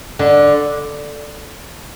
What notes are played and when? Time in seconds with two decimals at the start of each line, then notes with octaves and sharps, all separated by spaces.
0.19 D3